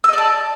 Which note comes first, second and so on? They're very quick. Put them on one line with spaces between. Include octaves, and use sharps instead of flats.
E6 D#5 D5 A5